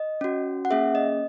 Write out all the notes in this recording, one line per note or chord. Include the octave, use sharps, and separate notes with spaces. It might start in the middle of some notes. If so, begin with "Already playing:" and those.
Already playing: D#5
C#4 F#4
F#5
A#3 C#4 G#4 E5
D#5